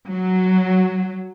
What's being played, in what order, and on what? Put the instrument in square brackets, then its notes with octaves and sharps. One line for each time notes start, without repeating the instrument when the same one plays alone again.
[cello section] F#3